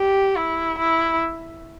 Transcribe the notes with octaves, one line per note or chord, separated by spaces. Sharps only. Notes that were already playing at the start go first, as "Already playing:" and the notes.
Already playing: G4
E4
E4